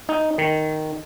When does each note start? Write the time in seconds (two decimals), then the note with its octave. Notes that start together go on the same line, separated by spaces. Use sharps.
0.09 D#4
0.38 D#3